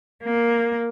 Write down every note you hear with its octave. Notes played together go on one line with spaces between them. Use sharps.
A#3